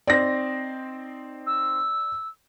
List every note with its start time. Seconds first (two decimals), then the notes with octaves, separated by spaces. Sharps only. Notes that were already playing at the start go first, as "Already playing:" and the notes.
0.07 C4 D#4 C5 D5 A#6
1.47 E6